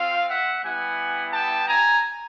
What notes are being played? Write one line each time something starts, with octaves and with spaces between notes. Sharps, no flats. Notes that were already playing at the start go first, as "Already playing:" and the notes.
Already playing: C4 F4 F5
E5 F#5
G3 B3 E4 G4 F#5 G#5
G5 A5
G#5 A#5